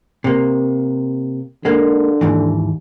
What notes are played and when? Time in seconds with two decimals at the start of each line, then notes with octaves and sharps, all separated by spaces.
0.24 C3 A#3
1.65 D3 G#3 A#3
2.21 D#2 G#2 E3